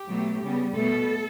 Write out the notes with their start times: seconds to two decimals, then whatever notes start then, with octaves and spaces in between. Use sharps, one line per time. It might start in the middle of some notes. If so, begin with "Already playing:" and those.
Already playing: G4
0.08 B2 F#3 A3
0.42 C#3 G3 B3
0.74 B2 A3 A4